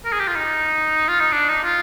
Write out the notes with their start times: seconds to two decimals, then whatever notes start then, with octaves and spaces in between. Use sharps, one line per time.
0.05 A#4
0.13 G#4
0.20 G4
0.28 F4
0.36 D#4
1.08 F4
1.20 D#4
1.32 D4
1.49 D#4
1.64 F4